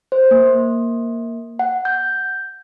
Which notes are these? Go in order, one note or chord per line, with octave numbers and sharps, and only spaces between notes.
C5
A#3
F#5
G6